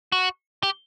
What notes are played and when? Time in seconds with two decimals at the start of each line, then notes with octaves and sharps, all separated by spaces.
0.12 F#4
0.63 G4